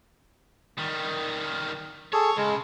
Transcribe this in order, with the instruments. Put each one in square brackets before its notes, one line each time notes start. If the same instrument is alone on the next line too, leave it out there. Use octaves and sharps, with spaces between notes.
[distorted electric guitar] D#3 G3
[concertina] G#4 A4 [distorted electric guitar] C#5
[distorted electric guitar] C#3 [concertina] G#3